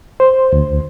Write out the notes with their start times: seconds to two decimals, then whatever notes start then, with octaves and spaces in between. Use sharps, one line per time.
0.20 C5
0.53 D2